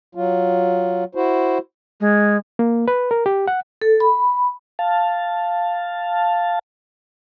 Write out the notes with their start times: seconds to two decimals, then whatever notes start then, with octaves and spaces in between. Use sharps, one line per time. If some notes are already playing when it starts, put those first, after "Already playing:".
0.15 F#3 F4
1.15 E4 F#4 C5
2.00 G#3
2.59 A#3
2.88 B4
3.11 A#4
3.26 G4
3.47 F#5
3.82 A4
4.00 B5
4.79 F5 A5